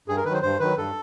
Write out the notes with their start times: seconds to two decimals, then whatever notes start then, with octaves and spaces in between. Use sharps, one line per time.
0.08 G2 G#4
0.17 A#4
0.25 D#3 B4
0.29 F#3 C5
0.42 G2 C5
0.60 D#3 F#3 B4
0.77 G2 A4